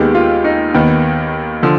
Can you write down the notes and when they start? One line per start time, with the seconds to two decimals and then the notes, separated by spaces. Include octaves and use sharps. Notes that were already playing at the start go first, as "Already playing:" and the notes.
Already playing: D#2 D#3 G#3 B3 G4
0.15 F4
0.44 D#4
0.74 D#2 D#3 B3
1.62 D3 F3